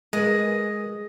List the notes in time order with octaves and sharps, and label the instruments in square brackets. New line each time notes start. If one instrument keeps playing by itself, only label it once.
[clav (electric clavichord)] G#3 [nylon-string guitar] A#4 B4 G#5 [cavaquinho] D#5